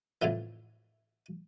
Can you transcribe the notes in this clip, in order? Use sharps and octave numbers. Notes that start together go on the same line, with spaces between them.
F2 A2 C#3 E3